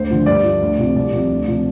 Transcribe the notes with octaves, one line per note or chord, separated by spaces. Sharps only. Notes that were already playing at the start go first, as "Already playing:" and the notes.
Already playing: D2 C5
D3 F3
G2 D5
F3
D2
C3 F3
C2 D5
C3 F3
D2
C3 F3